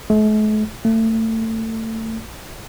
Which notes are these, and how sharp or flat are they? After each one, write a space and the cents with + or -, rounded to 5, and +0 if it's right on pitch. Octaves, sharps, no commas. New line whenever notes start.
A3 -45
A3 +30